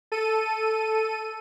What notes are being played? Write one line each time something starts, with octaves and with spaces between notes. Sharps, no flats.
A4 D#7